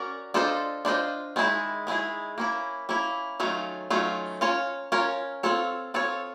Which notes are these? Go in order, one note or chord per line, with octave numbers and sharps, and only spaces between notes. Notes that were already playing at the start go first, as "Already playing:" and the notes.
Already playing: C#4 F#4 A#4 D5
D4 F4 A4 C5 D#5
D4 F4 A4 C5 D#5
D#3 G#3 B3 E4 G#4
D#3 G#3 B3 E4 G#4
A#3 C#4 E4
A#3 C#4 E4
D#3 F#3 A3 C#4 F4
D#3 F#3 A3 C#4 F4
C#4 F4 A#4 C#5
C#4 F4 A#4 C#5
C4 F4 A4 C#5
C4 F4 A4 C#5